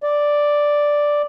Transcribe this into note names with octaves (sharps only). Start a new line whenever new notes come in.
D5